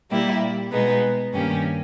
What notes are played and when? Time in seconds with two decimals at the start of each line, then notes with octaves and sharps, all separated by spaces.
0.11 A#2 G3 A#3 E4 G4
0.72 B2 G#3 B3 D#4 G#4
1.33 G2 D#3 A#3 C#4 G4